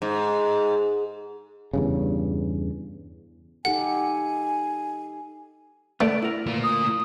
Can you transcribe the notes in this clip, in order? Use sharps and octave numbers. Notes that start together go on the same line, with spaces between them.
G#2
E2 G2 C#3
D#4 G4 A4 F#5 G#5
A3 B3 D5
E4 A#4
D2 A#3 F4
D#6